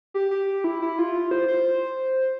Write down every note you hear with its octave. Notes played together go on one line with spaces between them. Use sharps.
G4
G4
E4
E4
F4
C5
C5